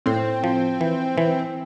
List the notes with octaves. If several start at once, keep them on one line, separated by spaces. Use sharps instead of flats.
A2 C4
F3
E3
E3